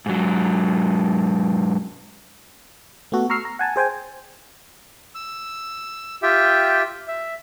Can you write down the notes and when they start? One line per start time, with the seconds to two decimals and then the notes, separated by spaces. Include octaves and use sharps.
0.06 G#2 F#3
3.12 A3 B3 F#4 A4
3.30 A#5 C#6 E6 F6 C7
3.45 A#5
3.59 F#5 G#5 A5
3.76 G#4 C5 G5 G#5
5.15 E6
6.23 F4 G4 E5 G5
7.08 E5